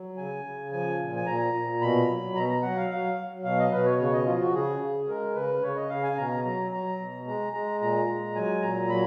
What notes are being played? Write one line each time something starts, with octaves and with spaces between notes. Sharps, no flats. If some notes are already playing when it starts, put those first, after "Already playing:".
Already playing: F#3
C#3 G#5
C#3
F3 G#5
A#2
G#5
A#2 A#5
A#2
B2 B5
F#3
B2 A#5
A#5
F#3 F#5
F5
F#3 F5
F#3
B2 F5
D#5
B2 B4
C#5
C#3 C#5
D#5
F3 F4
F#4
C#3 G#4
C#3
G#3 A#4
C#3 B4
C#3 C#5
D#5
C#3 F5
G#5
B2 A#5
F#3 A#5
F#3 A#5
B2
G#3 A#5
G#3 A#5
A#2 A#5
G#3
F#3 G#5
A#2 A#5
F#3 B5